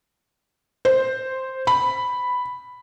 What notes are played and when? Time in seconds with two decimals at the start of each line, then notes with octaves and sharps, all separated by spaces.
0.85 C5
1.67 B5